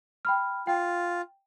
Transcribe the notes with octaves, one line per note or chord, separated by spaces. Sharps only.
G5 B5 F6
F4 G5